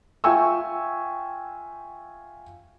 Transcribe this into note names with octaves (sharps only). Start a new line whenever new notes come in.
F4 E5 G5 G#5 C#6 E6